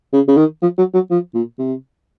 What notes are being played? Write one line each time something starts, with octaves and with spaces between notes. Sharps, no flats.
C#3
C#3
D#3
F3
F#3
F#3
F3
A#2
C3